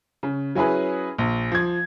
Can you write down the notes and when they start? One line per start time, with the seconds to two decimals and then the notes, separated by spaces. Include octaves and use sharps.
0.23 C#3
0.55 F#3 C#4 E4 G#4 B4
1.18 A#1
1.52 F3 G#6